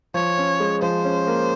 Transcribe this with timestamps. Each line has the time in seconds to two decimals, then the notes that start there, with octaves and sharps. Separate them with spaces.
0.14 F3 C#5
0.38 C#4
0.60 G#3
0.82 F3 C5
1.04 C#4
1.27 A#3